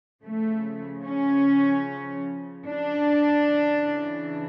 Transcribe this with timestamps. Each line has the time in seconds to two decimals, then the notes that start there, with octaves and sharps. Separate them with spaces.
0.24 C#3 F3 A3
1.04 C#4
2.66 D4
3.46 C#3 E3